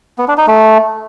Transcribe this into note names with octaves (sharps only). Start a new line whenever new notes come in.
B3
D4
D#4
A3